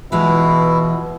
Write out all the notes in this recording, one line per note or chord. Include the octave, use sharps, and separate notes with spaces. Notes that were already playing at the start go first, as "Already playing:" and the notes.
B2 E3 G#3 E4 F4